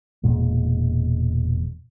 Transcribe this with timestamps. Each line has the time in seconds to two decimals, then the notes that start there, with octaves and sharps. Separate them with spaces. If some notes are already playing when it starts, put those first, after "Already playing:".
0.24 E1 A#2 G#3